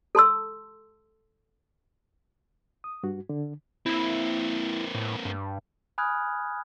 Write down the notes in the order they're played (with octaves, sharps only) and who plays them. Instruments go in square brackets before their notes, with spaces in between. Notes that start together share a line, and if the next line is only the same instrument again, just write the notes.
[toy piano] A4 A5 C6 E6
[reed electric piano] D#6
G2 F#4
D3
[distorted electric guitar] A#3 C4 [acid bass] E4
[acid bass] A2
G2
[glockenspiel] G#5 B5 D#6 F6 F#6 G#6